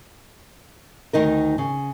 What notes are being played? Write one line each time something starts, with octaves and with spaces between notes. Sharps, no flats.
D2 D#3 D#4 A#4
C#3